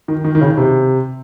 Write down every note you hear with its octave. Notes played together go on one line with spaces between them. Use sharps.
D#3
D#3
D#3
C#3
C3